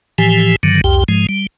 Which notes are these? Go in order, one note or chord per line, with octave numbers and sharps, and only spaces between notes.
A2 E3 F3 G4 G#5
G2 D3 D#3 F#3
C2 F2 G4 G5
G#2 F3 G#3
G3